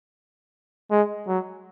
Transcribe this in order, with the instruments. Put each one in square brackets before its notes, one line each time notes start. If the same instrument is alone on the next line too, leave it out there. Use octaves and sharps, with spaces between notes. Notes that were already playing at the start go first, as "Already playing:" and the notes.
[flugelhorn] G#3
F#3